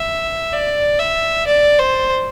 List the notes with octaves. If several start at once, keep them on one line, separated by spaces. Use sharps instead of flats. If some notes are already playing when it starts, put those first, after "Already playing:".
Already playing: E5
D5
E5
D5
C5